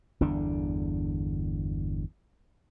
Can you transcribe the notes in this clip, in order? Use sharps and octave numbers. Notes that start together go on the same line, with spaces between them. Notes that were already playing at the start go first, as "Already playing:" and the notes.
G1 E2 D3 D4